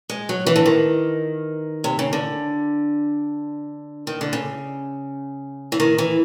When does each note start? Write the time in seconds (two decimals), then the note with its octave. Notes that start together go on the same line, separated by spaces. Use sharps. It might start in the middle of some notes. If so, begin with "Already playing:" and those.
0.10 G#3
0.29 F#3
0.46 E3
0.56 D3
0.66 D#3
1.84 C3
1.99 C#3
2.13 D3
4.07 D#3
4.21 D3
4.33 C#3
5.72 E3
5.80 D#3
5.98 E3